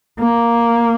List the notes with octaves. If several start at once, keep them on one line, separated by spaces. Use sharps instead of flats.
A#3